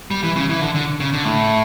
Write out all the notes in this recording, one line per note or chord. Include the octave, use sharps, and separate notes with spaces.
G3
E3
C#3
E3
D3
D3
C#3
D3
A2